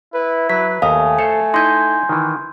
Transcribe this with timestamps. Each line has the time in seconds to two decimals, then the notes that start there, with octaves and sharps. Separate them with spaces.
0.14 E4 B4
0.50 F#3 B4 B6
0.82 D#2 A3 F5 G#5 A#5 D#6
1.19 A4 C5 F5 C#7
1.54 D#4 E4 D#5 C6 G6
2.09 D#3 E3